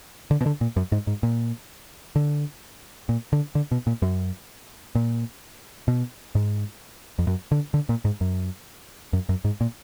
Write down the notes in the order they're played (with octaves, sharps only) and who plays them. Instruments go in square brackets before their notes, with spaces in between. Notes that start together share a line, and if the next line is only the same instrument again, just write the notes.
[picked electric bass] D3
B2
D3
A#2
F#2
G#2
G#2
A#2
D3
A#2
D3
D3
B2
A#2
F#2
A#2
B2
G#2
F2
F#2
D3
D3
A#2
G#2
F#2
F#2
F#2
G#2
A#2